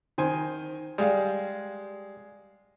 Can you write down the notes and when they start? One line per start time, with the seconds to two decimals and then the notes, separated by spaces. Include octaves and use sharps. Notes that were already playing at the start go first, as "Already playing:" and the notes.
0.18 D#3 C5 G#5
0.98 G3 G#3 F5